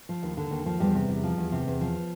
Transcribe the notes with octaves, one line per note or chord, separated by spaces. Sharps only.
F3
D#2
D3
D#2
F3
E2 G3 G4
C3
E2
F3
E2
C3
E2
F3